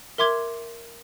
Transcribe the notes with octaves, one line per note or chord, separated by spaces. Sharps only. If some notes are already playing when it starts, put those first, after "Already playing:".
A#4 E5 C6 D6 G#6 G7